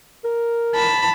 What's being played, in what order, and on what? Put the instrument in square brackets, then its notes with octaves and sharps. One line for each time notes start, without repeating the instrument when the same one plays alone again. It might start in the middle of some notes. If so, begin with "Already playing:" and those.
[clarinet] A#4
[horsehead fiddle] A5 [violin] B5